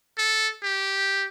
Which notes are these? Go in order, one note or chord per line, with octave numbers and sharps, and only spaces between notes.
A4
G4